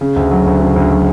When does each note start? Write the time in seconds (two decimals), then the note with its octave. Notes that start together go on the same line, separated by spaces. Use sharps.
0.01 C#3
0.16 D2
0.31 F#3
0.46 D2
0.61 C#3
0.76 D2
0.91 F#3